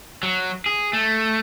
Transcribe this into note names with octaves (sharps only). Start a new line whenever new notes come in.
F#3
G#4
A3